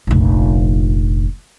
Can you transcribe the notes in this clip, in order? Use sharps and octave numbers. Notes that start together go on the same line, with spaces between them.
F1 A#1